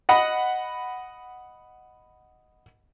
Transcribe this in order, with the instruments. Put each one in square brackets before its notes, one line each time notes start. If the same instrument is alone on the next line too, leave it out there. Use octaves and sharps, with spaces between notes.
[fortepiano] D#5 F#5 B5